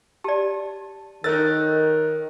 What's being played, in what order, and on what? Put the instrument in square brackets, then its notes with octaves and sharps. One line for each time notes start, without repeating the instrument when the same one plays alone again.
[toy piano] G4 D5 [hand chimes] A5
[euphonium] D#3 [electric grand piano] D#4 A#4 A6 [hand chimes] A4 C#5 F#6 [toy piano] E6